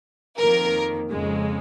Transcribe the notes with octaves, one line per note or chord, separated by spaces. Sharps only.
F2 D#3 A#3 A#4
F2 C#3 G#3